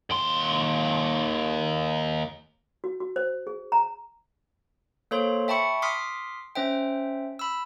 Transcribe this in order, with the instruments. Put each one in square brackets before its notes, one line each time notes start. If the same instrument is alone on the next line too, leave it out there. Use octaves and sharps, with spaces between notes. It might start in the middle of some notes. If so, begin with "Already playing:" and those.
[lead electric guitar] D#2 C6
[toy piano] F#4
F#4
C5
G#4
A#5
[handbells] A#3 A4 C5 C#5 C6
E5 G5 A5 B5 C#6 C#7
C6 D6 D#6 F6 B6 C7
C#4 C5 E5 G5
B5 E6